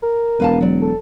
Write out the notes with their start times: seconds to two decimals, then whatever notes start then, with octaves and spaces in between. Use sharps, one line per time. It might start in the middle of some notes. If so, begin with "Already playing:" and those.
0.03 A#4
0.40 E1 B4 F5 A5
0.61 F#3 D5
0.82 A4